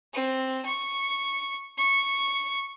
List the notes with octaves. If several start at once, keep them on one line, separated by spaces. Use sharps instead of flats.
C4
C#6
C#6